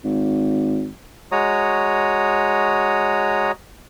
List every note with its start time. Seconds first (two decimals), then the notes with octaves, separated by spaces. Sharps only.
0.04 G#1
1.32 G#3 F#4 C#5 A#5 D#6